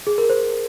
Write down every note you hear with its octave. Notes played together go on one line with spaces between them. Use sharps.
G#4
A#4
C5